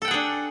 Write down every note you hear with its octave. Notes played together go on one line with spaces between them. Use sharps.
D4 G#4 A4 F#5 G5